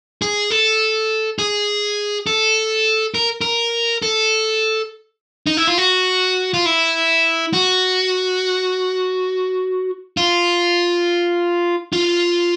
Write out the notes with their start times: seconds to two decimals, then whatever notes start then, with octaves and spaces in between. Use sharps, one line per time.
0.22 G#4
0.51 A4
1.39 G#4
2.27 A4
3.14 A#4
3.41 A#4
4.02 A4
5.47 D#4
5.57 E4
5.67 F4
5.78 F#4
6.54 F4
6.66 E4
7.53 F#4
10.17 F4
11.93 F4